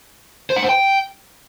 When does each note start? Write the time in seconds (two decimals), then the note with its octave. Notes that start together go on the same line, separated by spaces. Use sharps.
0.50 C5
0.56 F#5
0.63 C5
0.69 G5